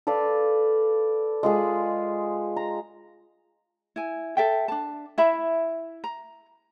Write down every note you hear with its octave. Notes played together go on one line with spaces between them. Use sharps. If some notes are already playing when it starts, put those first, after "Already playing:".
A4 B4 D5 F5
G#3 F4 G#4
A#5
E4 G#5
A4 E5 G5
D4 A5
E4 E5 B5
A#5